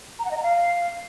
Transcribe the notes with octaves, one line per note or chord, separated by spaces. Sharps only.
A#5
F#5
D#5
A#5
F5